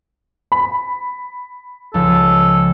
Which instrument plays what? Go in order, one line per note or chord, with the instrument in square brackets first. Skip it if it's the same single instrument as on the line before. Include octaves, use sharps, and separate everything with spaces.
[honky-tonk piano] B5
[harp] C#2 F3 [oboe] A4